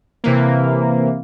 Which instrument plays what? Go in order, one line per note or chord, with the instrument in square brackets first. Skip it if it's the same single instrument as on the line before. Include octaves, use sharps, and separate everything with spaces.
[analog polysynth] C3 E3 A#3